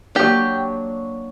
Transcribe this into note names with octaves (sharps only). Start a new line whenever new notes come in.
F#3 A#3 D4 G4